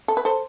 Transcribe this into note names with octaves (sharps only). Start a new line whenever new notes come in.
A4
B4
A4 C5